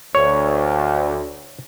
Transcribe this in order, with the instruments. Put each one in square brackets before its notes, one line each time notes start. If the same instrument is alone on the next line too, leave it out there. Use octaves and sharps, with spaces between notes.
[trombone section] D2 [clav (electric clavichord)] C#5